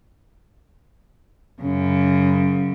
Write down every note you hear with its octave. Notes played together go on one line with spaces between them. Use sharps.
F#2 C#3